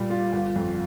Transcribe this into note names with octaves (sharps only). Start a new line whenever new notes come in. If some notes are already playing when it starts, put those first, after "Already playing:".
Already playing: A#2 G3 F4
F4
G1
F2